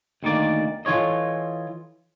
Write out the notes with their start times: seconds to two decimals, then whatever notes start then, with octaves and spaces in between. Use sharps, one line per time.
0.23 D2 D#3 A#3 D5
0.85 E3 F4 A4 C#5 D#5